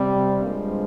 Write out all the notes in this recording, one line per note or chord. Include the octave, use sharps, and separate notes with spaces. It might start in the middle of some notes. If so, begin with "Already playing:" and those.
Already playing: C3 G3
G2 F3 G#3 A#3